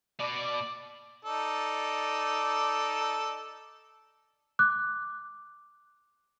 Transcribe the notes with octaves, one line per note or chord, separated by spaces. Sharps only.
B2 D5
D#4 A4 D5
D6 F#6